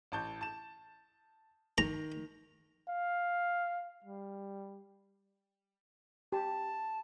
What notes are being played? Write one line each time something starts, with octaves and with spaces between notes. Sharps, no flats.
A1 A5 G6
A5 E7
D#3 A#5
F5
G3
G4 A5